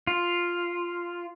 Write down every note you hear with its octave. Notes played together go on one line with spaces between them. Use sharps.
F4